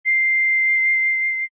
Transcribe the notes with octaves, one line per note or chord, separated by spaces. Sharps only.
C7